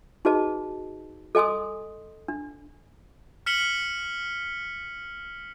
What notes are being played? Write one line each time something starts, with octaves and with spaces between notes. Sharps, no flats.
D#4 F#4 G#4 B4 D#5 A5
A4 D#5 G#5 C6 D#6
D4
F6 B6 C#7 E7 F#7 G7